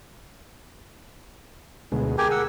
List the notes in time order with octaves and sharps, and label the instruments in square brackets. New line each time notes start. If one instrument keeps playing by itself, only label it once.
[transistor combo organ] D2 B2 G#3
[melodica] G4 G5 G#5 [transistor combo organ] G#4 A#4
[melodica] F#5 E6